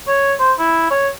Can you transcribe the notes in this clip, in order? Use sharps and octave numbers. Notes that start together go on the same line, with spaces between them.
C#5
C5
E4
C#5